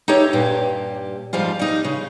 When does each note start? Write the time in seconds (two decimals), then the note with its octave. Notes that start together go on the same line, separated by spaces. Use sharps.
0.08 D#4 E4 G4 A4 C#5
0.33 G2 A#2 G4
1.33 G#2 F3 G3 F4
1.59 G3 D#4
1.84 C#3